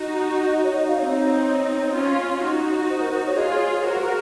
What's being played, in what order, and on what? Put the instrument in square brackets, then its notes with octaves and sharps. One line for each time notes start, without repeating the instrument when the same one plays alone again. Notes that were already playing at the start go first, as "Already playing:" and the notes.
Already playing: [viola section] D#4 F#4
[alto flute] D#5
C#5
D#5
F5
[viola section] C4 D#4 [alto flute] C#5
[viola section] C#4 F4
D#4 F#4
[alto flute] C5
A#4
C5
C#5
[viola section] F4 G#4 [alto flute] D#5
[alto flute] C#5
C#5
[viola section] F#4 A#4 [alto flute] C5
[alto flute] G#4